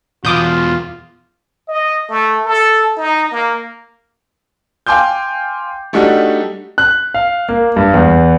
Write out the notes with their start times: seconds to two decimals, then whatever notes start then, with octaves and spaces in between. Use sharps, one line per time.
0.25 E2 B2 F4 D6 D#6 G6
1.68 D#5
2.10 A3
2.46 A4
2.97 D#4
3.32 A#3
4.87 F5 G5 G#5 C6 D6 G6
5.93 G3 A3 D4 D#4 F#4 G4
6.78 F#6
7.14 F5
7.49 A#3
7.76 G2
7.94 E2